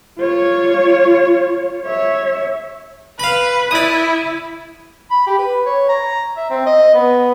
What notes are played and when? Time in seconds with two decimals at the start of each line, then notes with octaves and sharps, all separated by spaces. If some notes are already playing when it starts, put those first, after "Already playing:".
0.19 F4 C#5
1.85 C#5 E5
3.20 B4 F5 B5
3.71 E4 D5 D#6
5.10 B5
5.27 G4
5.38 B4
5.66 C#5
5.89 A#5
6.37 E5
6.50 C4
6.66 D#5
6.94 B3